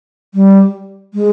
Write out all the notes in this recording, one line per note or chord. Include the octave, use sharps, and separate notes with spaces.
G3
G#3